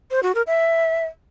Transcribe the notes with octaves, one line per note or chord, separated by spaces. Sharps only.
C5
F#4
A#4
E5